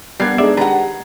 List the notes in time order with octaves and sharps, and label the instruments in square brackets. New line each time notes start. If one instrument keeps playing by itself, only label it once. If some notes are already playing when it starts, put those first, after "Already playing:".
[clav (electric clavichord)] G3 A#3 D4 [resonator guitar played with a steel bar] B3 [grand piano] F#5 G#6 C7
[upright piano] G#3 [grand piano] D4 D#4 G#4 [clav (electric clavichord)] D5 E5
[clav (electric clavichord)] D#3 D4 B4 [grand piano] G4 [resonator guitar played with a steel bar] F#5 A#5